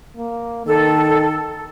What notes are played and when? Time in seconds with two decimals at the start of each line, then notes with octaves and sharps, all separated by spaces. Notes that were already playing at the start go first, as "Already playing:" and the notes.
0.17 A#3
0.66 D#3 A4